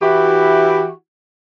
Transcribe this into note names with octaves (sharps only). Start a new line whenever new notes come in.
E3 E4 F#4 G4